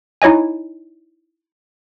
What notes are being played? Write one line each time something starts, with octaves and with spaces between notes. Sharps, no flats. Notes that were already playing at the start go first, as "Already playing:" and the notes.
D#4 E4 C#5 D#5 G#5